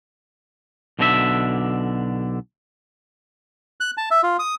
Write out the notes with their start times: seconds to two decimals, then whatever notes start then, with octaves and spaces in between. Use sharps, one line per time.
0.99 B1 B2 D3 D4 F#4 E5
3.80 F#6
3.97 A5
4.11 E5
4.23 F4
4.39 D#6